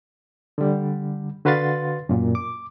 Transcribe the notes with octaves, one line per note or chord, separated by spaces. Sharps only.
D3 G3
D3 F#4 B4 F5 C6 A6
F#2 A#2
D6